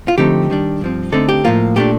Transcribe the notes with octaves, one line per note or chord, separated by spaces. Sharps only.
F4
D3 F3 A3 C4 D#4 G4
D#3 G3 D4
G2 F3 C4
D3 A3 C4 D#4 A4
G4
A2 F3 A#3 F4
A#2 A3 D4 G4